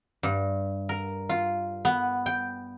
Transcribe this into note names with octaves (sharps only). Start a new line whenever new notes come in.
G2
A#4
F4
B3
G5